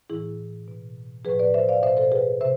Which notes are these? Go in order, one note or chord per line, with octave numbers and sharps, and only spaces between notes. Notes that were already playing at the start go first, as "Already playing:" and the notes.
A2 E3 E4 G#4
B2
A2 F3 G#4 B4
B4 D5
C5 E5
D5 F5
B2 C5 E5
A4 C5
G#4 B4
C3 C5 E5